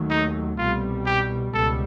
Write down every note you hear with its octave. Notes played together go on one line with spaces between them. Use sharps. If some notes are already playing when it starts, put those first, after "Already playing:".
Already playing: D#2 D#3 F#3 A3
D#4
C2 B2 G3 F4
G4
C#2 B2 G3 A4